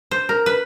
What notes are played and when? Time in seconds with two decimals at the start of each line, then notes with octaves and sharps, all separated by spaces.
0.11 C5
0.29 A#4
0.46 B4